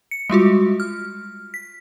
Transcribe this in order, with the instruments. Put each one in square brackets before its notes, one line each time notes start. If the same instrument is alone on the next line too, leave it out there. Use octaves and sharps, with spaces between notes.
[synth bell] C#7
G3 G#3 F4 F#4
F6
B6